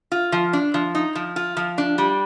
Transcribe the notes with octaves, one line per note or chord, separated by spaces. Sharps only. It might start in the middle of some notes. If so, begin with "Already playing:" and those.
F4
F3
D4
F3
D#4
F3
F4
F3
D4
G3